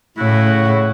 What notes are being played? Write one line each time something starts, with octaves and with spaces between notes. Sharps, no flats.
A2 C#3 E4 F#4